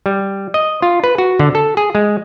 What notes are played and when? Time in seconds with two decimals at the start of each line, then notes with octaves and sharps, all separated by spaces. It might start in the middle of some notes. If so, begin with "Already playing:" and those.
0.06 G3
0.54 D#5
0.82 F4
1.04 B4
1.18 F#4
1.39 D3
1.55 A4
1.77 G#4
1.95 G#3